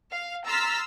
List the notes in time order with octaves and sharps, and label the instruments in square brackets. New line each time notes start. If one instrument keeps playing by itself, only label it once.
[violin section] F5
A#5 C6 E6 F6 A6 B6